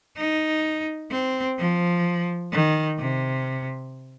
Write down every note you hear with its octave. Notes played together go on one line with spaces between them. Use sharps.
D#4
C4
F3
D#3
C3